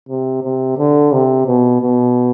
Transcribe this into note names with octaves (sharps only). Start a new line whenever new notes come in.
C3
C3
D3
C3
B2
B2